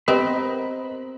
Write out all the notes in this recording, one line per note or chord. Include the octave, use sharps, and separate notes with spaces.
B3 C4 G4 A#4 B4 D#5 B5